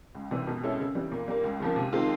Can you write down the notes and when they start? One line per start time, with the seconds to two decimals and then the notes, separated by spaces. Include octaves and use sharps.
0.15 C#2
0.31 C3 E3 G3
0.47 B2
0.64 G#3 C#4 E4 A4
0.79 C#3
0.95 E3 G3
1.12 A#2
1.28 G3 A#3
1.44 C#2
1.60 C#3 F3 A#3
1.76 C3
1.93 D#3 G#3 C4 F4